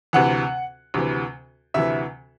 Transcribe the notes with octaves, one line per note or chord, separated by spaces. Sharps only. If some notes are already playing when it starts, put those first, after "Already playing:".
D2 C3 E3 F#5
D2 C3 E3
D2 C3 E3 E5